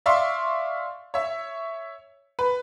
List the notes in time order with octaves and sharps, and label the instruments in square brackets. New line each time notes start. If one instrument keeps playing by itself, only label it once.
[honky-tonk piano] D5 E5 F5 C6 C#6
C#5 E5
B4